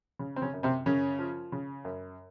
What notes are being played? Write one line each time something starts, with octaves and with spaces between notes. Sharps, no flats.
C#3
C4
C#3 C#4
F#2
C3 C4
F#2 C#3 C#4
F3
C#3
F#2